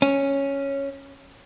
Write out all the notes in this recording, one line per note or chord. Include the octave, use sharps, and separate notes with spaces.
C#4